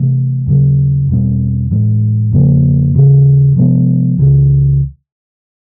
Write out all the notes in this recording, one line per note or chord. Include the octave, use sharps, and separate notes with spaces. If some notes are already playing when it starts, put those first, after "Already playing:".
Already playing: C3 E3 A3
D#2 C#3 F#3
E2 B2 G3 C4
A2 E3 G#3
E2 C#3 F3 A#3
D#2 C#3 E3
C3 F3 G#3 B3
C#2 C#3 E3